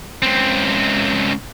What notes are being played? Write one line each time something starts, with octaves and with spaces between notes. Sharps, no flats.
C#2 C4